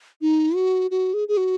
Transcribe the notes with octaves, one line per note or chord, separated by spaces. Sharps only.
D#4
F#4
F#4
G#4
G#4
F#4